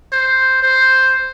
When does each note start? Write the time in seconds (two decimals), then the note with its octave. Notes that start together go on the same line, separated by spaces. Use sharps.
0.13 C5
0.63 C5